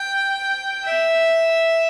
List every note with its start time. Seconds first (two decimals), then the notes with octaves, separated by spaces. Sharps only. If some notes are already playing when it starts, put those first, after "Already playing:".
Already playing: G5
0.84 E5